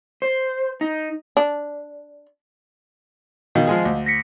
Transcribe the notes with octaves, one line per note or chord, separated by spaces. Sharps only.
C5
D#4
D4
B2 D#3 D#5 F5
F3 G#3 G#4
D2
A#6 B6 C#7